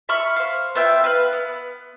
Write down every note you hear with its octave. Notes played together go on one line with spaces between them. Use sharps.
E5 B5 C#6 F6
C5 F5
B3 F4 E5 G5
B4 F5
B3